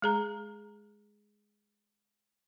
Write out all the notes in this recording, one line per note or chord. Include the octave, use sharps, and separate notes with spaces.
G#3 G#4 A#5